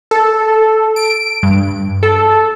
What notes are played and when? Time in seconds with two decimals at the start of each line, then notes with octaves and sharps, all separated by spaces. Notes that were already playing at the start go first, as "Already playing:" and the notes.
0.11 A4
0.96 D7
1.43 G2
2.03 A4